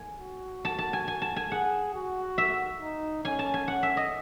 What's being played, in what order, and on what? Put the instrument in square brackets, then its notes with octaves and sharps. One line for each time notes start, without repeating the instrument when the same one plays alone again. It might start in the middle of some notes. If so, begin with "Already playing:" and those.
Already playing: [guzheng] G#5
[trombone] F#4
[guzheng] A5
A5
G#5
G#5
A5
G#5
[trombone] G#4 [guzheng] F#5
[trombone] F#4
[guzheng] E5
[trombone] D#4
[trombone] C#4 [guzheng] G#5
[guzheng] A5
G#5
F#5
E5
D#5